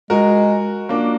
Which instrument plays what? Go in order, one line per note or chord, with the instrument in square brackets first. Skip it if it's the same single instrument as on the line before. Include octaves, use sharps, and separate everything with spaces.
[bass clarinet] G#3 [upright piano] F#4 A#4
[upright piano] A#3 D4